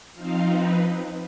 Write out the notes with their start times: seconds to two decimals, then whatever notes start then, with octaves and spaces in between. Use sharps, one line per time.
0.15 F3 C4 D#4 F5
0.49 B4